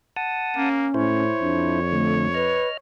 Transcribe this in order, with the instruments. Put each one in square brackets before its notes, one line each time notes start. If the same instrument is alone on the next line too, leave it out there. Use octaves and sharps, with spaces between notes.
[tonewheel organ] F#5 A5 D#6
[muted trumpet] A#3 [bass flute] C#4
[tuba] A2 [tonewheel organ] E4 C5 [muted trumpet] C#5
[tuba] F2 [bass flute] D4
[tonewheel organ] D3 [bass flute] A3
[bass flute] B4 [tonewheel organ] D#5 F6